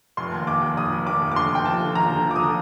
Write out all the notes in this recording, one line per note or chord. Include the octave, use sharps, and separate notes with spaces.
F1 C6
D#2
D#2 D6
D#2
F1 D#6
F1
D#2 D6
F1
D6
D3 C6
F1 G5
F3 A5
D3
D#2 A#5
D3
F3
D6
D#6
D3